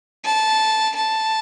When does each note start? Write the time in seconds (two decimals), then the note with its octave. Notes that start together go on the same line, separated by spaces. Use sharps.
0.25 A5
0.95 A5